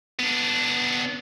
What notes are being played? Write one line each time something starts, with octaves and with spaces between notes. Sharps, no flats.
B3 D4